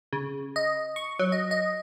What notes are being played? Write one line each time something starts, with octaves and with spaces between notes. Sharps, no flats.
C#3
D#5
C#6
F#3
D#5
D#5